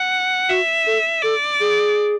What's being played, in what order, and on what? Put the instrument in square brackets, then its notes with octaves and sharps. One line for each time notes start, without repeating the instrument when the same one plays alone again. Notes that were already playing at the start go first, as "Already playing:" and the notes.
Already playing: [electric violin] F#5
[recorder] F#4 [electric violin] E5
[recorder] A4
[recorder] A4 [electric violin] D5
[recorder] G#4